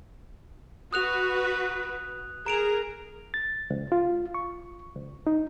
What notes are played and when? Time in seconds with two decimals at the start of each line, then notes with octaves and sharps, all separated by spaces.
0.93 F#4 B4 D#6 F#6 F7
2.46 G#4 A#4 A#5 D7 F7
3.34 A6
3.70 C#2
3.92 F4
4.34 C#6
4.96 C#2
5.27 D#4